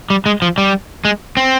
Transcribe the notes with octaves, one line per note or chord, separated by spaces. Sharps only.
G3
G#3
F3
G3
G#3
C4